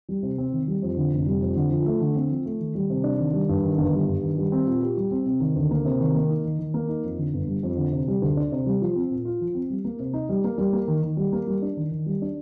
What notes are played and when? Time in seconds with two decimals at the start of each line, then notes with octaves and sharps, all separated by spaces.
0.09 G3
0.23 C3
0.38 C4
0.52 D#3
0.68 G3
0.82 F2
0.97 D3
1.12 F1
1.26 G3
1.42 F2
1.56 D3
1.71 F3
1.86 A3
2.01 D3
2.15 C4
2.30 F3
2.45 A3
2.60 D#3
2.75 G3
2.90 C3
3.04 D4
3.19 D#3
3.33 G3
3.49 G2
3.63 D#3
3.78 G1
3.93 G3
4.08 G2
4.23 D#3
4.38 G3
4.52 C4
4.67 A#2
4.81 G4
4.97 G3
5.11 C4
5.26 C3
5.40 D#3
5.55 D2
5.71 A#3
5.85 C3
6.00 D#3
6.14 A#3
6.29 D#4
6.45 D#3
6.59 D#3
6.74 A#3
6.89 D#4
7.04 F2
7.18 D3
7.34 G1
7.47 G3
7.63 F2
7.77 D3
7.92 C3
8.08 G3
8.22 D2
8.37 D4
8.52 C3
8.66 G3
8.81 F3
8.96 C4
9.11 A#2
9.25 F4
9.41 F3
9.55 C4
9.70 G3
9.85 A#3
9.99 C3
10.13 D#4
10.29 G3
10.44 A#3
10.58 G3
10.73 A#3
10.88 D#3
11.03 D#3
11.17 G3
11.33 A#3
11.47 G3
11.62 D4
11.77 D#3
11.91 D#3
12.06 G3
12.22 D4